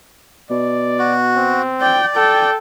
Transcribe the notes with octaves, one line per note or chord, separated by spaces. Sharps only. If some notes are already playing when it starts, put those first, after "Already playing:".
B2 D5
F#4
C4
D5 G5
A4 G5